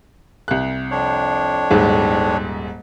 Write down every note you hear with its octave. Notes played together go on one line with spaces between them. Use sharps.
C2 F#6
F2 D4 C#5
D#1 G#2